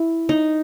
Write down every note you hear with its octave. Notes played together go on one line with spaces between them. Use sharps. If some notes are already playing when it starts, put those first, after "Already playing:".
Already playing: E4
D#4